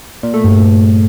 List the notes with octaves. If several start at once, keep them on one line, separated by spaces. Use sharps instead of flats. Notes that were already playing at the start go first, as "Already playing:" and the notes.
A#2
A3
G2